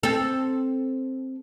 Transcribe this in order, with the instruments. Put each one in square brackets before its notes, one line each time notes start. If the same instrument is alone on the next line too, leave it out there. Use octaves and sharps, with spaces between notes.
[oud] C4 A4